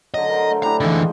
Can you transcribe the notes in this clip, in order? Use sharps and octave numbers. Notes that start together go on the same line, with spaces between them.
D3 F#3 D#5
A#4 C5
A3
D4 E4 G4 A#5
G#2 D3 E3 F3 D#5